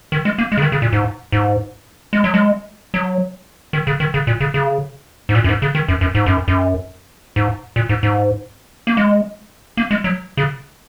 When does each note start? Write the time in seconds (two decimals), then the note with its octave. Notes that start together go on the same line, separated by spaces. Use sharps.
0.12 D#3
0.25 G#3
0.38 A#3
0.52 G#3
0.57 C#3
0.62 D#3
0.72 C#3
0.82 A#2
0.92 G#2
1.32 G#2
2.13 G#3
2.24 F#3
2.34 G#3
2.94 F#3
3.73 D#3
3.87 C#3
4.00 D#3
4.14 C#3
4.27 A#2
4.40 C#3
4.54 C#3
5.29 G#2
5.35 A#2
5.44 F#2
5.49 G#2
5.62 C#3
5.75 D#3
5.88 F#2
6.01 F#2
6.15 G#2
6.26 F#2
6.48 F#2
7.36 G#2
7.76 A#2
7.89 G#2
8.03 G#2
8.87 A#3
8.97 G#3
9.77 A#3
9.91 G#3
10.04 F#3
10.37 C#3